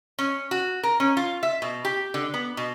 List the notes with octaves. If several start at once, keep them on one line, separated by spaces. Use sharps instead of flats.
C#4
F#4
A#4
C#4
F4
E5
B2
G4
D3
B3
B2